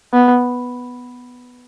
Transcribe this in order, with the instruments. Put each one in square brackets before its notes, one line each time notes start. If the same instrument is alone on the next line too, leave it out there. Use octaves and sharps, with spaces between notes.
[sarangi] B3